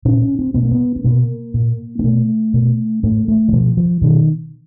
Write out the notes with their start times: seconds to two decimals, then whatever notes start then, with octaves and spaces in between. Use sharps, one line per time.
0.05 A#2 C#4
0.22 C#4
0.39 C4
0.54 B2 B3
0.63 A#3
0.71 B3
0.96 B3
1.04 B2 A#3
1.54 A#2
1.99 A#3
2.04 B2 A3
2.54 B2
3.03 A2 A3
3.28 A3
3.48 E3
3.52 B2 F3
3.77 F3
4.02 B2 D#3